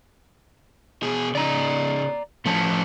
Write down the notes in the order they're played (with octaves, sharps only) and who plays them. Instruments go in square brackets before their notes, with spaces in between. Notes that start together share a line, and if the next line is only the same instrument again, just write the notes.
[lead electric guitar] B2 G#4
[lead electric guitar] C#3 D#4 [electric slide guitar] D5 A#5
[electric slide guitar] A2 F3 A5 [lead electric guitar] A3 C#4